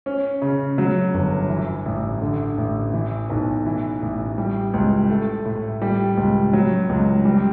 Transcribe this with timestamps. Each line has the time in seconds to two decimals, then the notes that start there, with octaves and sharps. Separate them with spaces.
0.06 C#4
0.42 C#3
0.78 F#3
1.14 G1
1.49 E3
1.85 A1
2.21 D3
2.58 A1
2.93 E3
3.30 B1
3.66 E3
4.02 A1
4.38 G3
4.73 C#2
5.10 A3
5.45 A2
5.82 G3
6.17 C#2
6.53 F#3
6.89 C#2
7.25 G3